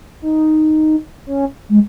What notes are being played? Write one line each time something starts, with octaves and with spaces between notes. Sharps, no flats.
D#4
C#4
G#3